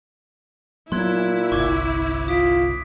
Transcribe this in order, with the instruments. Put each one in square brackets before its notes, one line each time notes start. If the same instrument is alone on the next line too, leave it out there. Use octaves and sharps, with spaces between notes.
[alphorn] A#2 [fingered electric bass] F#3 B3 [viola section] E4 [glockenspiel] C6 F#6 G#6
[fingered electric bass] G1 C2 [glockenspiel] C#6 D6 G#6
[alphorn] F4 [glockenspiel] D#6 B6 D7